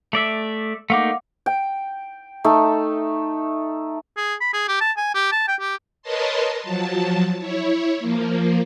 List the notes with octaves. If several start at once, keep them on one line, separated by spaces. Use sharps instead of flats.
A3 D5 E5
A3 A#3 D#4 F5 F#5 D6
G5
A3 D#4 A4
G#4
B5
G#4
G4
A5
G#5
G4
A5
G5
G4
A#4 B4 C#5 D#5 A5 C6
F3 F#3 A5
E4 C#5
F3 A#3